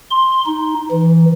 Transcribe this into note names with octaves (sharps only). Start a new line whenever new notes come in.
C6
D#4
E3